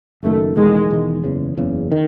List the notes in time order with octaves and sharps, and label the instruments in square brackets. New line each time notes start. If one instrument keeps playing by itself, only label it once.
[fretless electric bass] F#1 F#2 D#3 [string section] A3
[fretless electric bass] E1 E2 D#3 [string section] G#3
[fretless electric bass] E1 E2 D#3
F#1 E2 C#3
F#1 E2 C#3
D#3